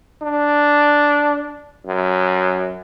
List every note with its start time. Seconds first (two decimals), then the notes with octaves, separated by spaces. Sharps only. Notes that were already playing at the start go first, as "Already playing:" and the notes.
0.22 D4
1.87 F#2